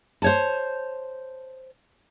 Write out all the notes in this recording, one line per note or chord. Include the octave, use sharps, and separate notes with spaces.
C5 C#5 A5